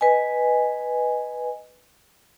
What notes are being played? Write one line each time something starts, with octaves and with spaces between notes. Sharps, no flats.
B4 D#5 G#5